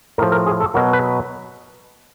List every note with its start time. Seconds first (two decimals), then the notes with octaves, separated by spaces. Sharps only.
0.18 A2 F3 A#4
0.32 A#4
0.46 G#4
0.60 A4
0.74 B2 F#3 A#4
0.93 B4